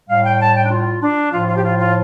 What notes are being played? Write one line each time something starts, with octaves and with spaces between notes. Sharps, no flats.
A2 G3 F5
G5
A5
G5
D4
F4
D4
A2 F3 F4
F4
G4
F4
F4